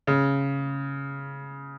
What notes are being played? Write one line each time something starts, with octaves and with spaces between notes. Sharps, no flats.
C#3